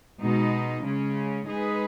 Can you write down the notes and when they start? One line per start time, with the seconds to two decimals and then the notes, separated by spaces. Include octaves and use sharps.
0.22 B2 G#3 D#4
0.85 C#3 G#3 C#4
1.47 G#3 D#4 G#4 B4